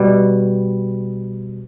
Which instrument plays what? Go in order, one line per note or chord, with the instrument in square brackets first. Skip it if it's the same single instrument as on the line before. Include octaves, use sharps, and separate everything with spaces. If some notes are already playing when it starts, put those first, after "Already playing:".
Already playing: [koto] B2 G3